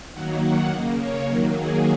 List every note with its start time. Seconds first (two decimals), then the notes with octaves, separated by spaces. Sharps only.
0.13 D#3 F#3 A#3 F#5
0.42 F#5
0.69 C#3 A#3 D#5
0.98 C#5
1.27 D#3 F#3 A#3
1.55 G#4